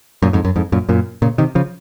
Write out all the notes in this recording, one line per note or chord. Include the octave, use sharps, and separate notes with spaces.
F#2 A#2
F2 G#2
F#2
F2 G#2
F#2 A#2
F#2 A#2
A#2 C#3
C3 D#3
C#3 F3